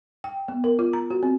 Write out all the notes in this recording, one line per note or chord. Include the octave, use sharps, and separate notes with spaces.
G5
B3
A#4
F4
A#5
F#4
C4